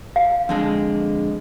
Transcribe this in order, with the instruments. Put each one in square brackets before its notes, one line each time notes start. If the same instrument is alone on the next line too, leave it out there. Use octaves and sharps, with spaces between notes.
[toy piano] F5
[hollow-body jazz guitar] F2 D3 G#3